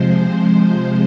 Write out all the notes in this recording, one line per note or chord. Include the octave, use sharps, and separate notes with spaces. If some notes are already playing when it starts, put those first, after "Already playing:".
Already playing: C3 F3 G#3 C5